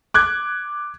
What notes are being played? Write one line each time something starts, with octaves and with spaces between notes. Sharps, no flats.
D6 F#6 G#6